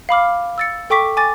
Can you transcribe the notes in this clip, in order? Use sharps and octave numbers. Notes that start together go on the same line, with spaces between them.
F5 B5 D6 F6
E6 A6 C#7
A4 G5 C#6 D6 B6
G#5 D6 A6